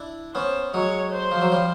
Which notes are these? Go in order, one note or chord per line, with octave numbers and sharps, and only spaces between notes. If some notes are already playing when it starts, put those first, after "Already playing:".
Already playing: D4 E4
B3 C#4 C5
F#3 G#3 C#5
C5
F3
F#3
F3 G3